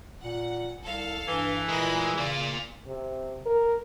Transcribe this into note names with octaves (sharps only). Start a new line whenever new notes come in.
A#2 F#5
C2 A4 F5
G2 E3
A#2 G#3 A#4 B5
C#3 A#3 F4 D5
C3
A#4